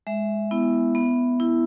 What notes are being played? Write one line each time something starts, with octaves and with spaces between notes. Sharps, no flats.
G#3 E5
B3 E4
B3
E4